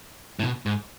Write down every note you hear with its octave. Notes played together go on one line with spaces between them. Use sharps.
A2
B2
G#2